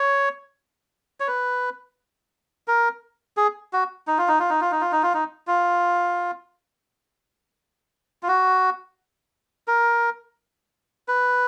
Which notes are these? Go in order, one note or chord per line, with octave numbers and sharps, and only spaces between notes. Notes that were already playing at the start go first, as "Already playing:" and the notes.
Already playing: C#5
C#5
B4
A#4
G#4
F#4
D#4
F4
D#4
F4
D#4
F4
D#4
F4
D#4
F4
D#4
F4
F4
F#4
A#4
B4